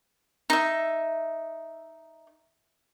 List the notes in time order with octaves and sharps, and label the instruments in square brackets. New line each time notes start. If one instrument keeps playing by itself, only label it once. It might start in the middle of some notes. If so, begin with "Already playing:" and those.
[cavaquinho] D#4 E5